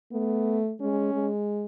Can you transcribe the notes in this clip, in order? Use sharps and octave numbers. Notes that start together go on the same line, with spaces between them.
A3 B3
G#3 C#4
G#3